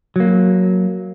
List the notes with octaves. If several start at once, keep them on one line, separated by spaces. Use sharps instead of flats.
F#3 A#3